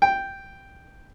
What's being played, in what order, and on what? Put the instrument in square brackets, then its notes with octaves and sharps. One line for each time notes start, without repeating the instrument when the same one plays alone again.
[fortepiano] G5